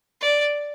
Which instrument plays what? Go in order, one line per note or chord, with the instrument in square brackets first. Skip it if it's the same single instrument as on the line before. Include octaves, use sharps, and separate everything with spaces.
[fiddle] D5